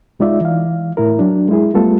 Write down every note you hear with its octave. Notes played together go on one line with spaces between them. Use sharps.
C2 G#3 D#4 F4 D5 E5
E3 F5
A2 E4 A#4
F#3 D4
G#3 E4 G#4
G3 A3 B3 F4 A4